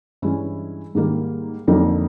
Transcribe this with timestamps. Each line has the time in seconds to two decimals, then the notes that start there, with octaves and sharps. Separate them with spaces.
0.22 G2 E3 G#3 C#4 E4
0.95 G#2 D#3 G3 A#3
1.68 F2 D3 F#3 A#3 D#4